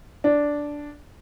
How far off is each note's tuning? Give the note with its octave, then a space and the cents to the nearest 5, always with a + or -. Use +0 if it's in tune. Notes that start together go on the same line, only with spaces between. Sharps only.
D4 -5